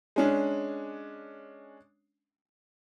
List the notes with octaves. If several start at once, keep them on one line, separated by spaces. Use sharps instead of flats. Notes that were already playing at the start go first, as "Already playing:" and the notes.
G#3 C#4 D4